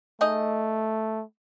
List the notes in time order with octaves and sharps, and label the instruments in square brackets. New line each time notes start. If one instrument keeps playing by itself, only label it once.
[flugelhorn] A3 [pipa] D#4 G#4 D#5